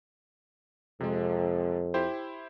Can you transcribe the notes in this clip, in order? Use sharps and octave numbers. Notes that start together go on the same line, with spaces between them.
F2 C3 G#3
E4 G4 C5